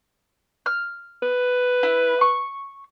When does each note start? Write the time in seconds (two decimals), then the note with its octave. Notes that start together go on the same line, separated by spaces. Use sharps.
0.66 F6
1.22 B4
1.83 E4
2.21 C#6